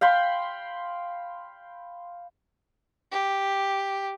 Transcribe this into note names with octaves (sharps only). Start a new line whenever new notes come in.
F5 G5 B5 C6
G4